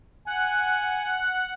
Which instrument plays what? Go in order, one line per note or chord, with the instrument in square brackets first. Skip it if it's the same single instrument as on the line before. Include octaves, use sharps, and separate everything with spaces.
[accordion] F#5 F#6 [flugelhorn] G#5